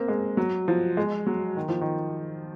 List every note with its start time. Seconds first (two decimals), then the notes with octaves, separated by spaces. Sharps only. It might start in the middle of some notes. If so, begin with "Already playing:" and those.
Already playing: A#3 C4
0.08 G#3
0.37 F#3
0.68 F3
0.97 G#3
1.27 F#3
1.57 D#3
1.69 F3
1.81 D#3